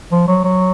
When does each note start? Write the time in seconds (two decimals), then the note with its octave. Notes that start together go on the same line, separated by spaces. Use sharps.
0.12 F3
0.28 F#3
0.44 F#3